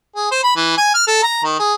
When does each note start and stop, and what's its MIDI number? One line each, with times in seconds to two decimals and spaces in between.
0.15 0.31 68
0.31 0.43 72
0.43 0.51 83
0.56 0.72 52
0.77 0.92 80
0.94 1.04 89
1.07 1.22 69
1.23 1.41 82
1.44 1.57 51
1.59 1.73 68